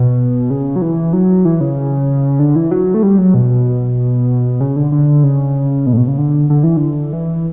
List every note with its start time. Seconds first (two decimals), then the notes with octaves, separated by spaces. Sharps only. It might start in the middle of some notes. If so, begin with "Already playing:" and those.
Already playing: B2
0.50 C#3
0.76 F#3
0.82 E3
1.13 F#3
1.45 E3
1.61 C#3
2.39 D3
2.56 E3
2.71 F#3
2.94 A3
3.03 G3
3.18 F#3
3.34 B2
4.61 C#3
4.76 D3
4.92 D3
5.23 C#3
5.86 B2
5.93 A2
5.97 B2
6.08 C#3
6.18 D3
6.50 D3
6.64 E3
6.77 D3
7.13 E3